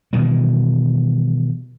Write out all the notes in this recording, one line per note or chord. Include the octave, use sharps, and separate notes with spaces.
B2 D#3 E3 G3